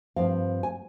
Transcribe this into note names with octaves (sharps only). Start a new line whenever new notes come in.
G2 F3 C4 F5
G#5